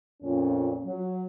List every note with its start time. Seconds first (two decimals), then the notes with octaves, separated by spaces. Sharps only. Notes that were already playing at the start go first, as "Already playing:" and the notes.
0.21 F2 A#2 C#4
0.84 F#3